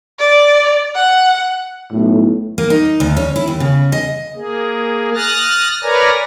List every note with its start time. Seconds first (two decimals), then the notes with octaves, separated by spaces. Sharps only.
0.19 D5
0.95 F#5
1.92 B1 A2
2.58 A#3
2.70 D#4
3.00 D2
3.17 C#4
3.36 E4
3.48 D#2
3.60 C#3
3.92 D#5
4.35 A#3 G#4
5.14 D#6 F6 F#6 A6 A#6
5.83 A#4 B4 C#5 D5 G#5 A#5